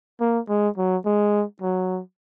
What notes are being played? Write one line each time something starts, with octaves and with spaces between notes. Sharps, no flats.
A#3
G#3
F#3
G#3
F#3